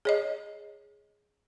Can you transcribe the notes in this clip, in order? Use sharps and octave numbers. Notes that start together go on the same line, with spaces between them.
G#4 C#5 D#5